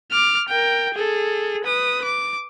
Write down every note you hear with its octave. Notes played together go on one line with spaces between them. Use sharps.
D6 F6
A#4 G5
G#4 A4
B4 D#6
D6